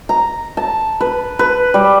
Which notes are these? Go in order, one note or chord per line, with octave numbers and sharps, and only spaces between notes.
A#5
A5
B4
B4
G3